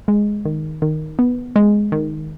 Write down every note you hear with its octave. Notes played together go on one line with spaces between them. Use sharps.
G#3
D#3
D#3
B3
G#3
D#3